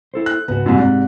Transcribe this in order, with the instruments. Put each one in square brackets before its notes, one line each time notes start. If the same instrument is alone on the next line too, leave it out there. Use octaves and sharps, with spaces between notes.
[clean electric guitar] E4 A4 C5
[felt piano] F#6
[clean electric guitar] C#2 G#2 F#4 [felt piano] B3
[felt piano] C2 F#2
[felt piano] G#2 C3 [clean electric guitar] D5